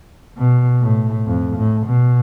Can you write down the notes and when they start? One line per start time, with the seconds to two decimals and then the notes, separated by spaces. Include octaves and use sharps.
0.37 B2
0.82 A2
1.27 F2
1.56 A2
1.86 B2